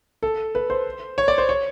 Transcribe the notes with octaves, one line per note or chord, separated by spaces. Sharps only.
A4
B4
C5
C#5
D5
C5
C#5